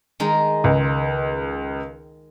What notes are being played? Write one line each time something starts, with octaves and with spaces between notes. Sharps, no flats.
D#3 G#3 A#4
C#2